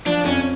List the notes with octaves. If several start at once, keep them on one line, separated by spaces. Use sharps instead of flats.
F3 D4
F2 C#4